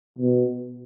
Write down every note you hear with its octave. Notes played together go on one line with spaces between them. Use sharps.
B2